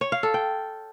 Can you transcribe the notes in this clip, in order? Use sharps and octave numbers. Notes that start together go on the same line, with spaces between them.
C#5
F5
A4
G5